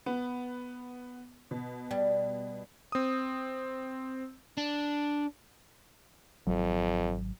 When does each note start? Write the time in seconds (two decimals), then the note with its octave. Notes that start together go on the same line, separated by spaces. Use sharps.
0.06 B3
1.51 B2
1.91 G3
2.92 C4 D#6
4.57 D4
6.47 G#1 F2 F#3